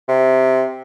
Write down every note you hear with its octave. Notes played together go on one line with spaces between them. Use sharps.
C3